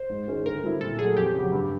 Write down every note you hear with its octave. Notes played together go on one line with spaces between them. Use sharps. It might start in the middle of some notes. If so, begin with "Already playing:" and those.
Already playing: C5
G#2
D#3 G#3 C#4
D3 A#4
G3 C4 E4
A#2 A4
F#3 A3 G#4
F2 G4
C#3 F#3
G2